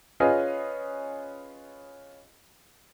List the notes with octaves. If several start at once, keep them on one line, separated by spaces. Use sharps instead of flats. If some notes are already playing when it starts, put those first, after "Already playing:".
C#4 F4 G#4 B4 D#5 G#5